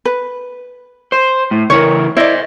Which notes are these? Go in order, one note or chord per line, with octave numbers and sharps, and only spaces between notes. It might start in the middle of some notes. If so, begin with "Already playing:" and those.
B4
C5
A2
C#3 E3 A#4 C#5
E4 C5 D5 D#5